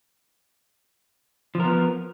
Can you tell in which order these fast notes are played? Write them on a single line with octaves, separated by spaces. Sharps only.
F3 A#4 B3